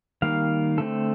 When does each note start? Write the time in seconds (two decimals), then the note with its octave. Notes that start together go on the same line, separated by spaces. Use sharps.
0.22 D#3 G3 A#3 F5
0.78 D3 A3 C4 A4